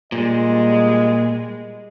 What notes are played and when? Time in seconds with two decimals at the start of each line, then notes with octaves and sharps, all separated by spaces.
0.12 A#2 G3 G#3 D#5